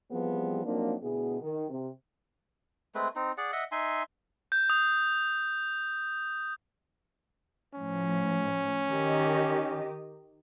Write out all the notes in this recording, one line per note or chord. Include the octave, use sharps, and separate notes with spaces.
E3 F3 G3 B3 C4 G#4
F3 F#3 A#3 C4 D4 D#4
D2 B2 B3 E4 G#4
D#3
C3
G#3 A3 C4 B4
C4 D#4
G#4 D5 F#5
D#5 E5 F#5
D#4 E5 G#5 C6
G6
D#6
A2 F3 C#4
D#3 G4 D#5